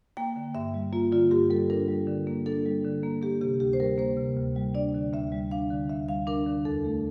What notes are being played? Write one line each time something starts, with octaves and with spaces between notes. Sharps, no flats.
A#3 G5
D3
G2 E5
G3
A#3 F4
D3 F4
G2 G4
G3 A4
D4 A#4
G3
D3
A#3
D4 A4
G3
D3
A#3
A#3 G4
C3 G4
D2 G4
C5
G3 A#4
A#3 C5
C3
D2
G3
D4 D5
D3
D2 E5
G3
D4 F5
D3
D2 E5
G3 F5
D4 A#4
D3
E2 A4
A3